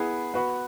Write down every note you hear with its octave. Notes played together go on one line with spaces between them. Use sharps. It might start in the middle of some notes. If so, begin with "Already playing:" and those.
Already playing: B3 E4 G#4
B3 F#4 B4